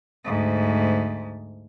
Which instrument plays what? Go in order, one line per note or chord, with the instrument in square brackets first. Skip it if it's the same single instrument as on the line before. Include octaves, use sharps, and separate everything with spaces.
[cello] D2 G#2